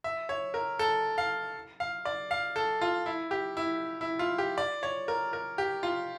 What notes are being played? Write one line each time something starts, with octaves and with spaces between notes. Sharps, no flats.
E5
C#5
A#4
A4
F5
F5
D5
F5
A4
F4
E4
G4
E4
E4
F4
G4
D5
C#5
A#4
A#4
G4
F4